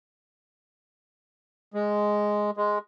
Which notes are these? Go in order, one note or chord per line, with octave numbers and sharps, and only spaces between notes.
G#3
G#3